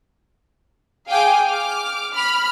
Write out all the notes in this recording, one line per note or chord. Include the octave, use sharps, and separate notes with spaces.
G#4 F5 G5 G#5 D6
D6 F6
B5 F6